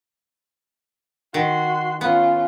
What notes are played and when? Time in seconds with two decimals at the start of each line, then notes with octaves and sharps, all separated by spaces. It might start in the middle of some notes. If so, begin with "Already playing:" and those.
1.34 D#3 F#4 C6
2.01 B3 C#4 F4